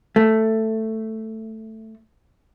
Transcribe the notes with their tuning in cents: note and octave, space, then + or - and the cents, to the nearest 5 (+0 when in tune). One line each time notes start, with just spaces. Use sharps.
A3 +5